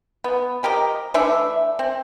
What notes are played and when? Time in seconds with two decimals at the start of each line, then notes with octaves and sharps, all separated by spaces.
0.24 B3
0.63 F3 G4 A#4 D#5
1.14 E3 A3 D4 E5
1.79 C4